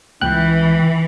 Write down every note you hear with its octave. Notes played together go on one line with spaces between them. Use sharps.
C#2 E3 G5 F#6